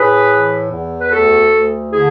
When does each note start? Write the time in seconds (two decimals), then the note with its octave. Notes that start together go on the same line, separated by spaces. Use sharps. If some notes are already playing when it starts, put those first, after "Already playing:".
Already playing: A2 G#4 B4
0.30 E3
0.70 E2
1.01 B4
1.10 D2 F#4 A4
1.51 D2
1.91 D3 E4 G#4